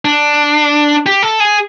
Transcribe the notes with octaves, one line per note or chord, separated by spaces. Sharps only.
D4
G4
A4
G#4